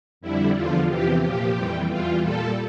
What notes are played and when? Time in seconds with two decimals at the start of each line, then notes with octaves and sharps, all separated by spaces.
0.21 F2 D3 G3 E4
0.54 E2 D3 F3 F4
0.88 E2 C3 E3 G4
1.22 A#2 F3 G4
1.55 F2 E3 G3
1.88 E2 E3 G3 F4
2.22 A#2 G3 A4